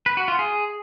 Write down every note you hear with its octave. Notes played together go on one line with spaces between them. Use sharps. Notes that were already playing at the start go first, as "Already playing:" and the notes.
B4
F#4
F4
G#4